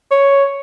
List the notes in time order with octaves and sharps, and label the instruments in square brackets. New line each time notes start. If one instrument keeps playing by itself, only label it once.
[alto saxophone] C#5